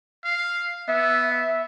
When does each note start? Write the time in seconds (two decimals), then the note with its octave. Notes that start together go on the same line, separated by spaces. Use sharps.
0.24 F5
0.89 B3 E5
1.30 E5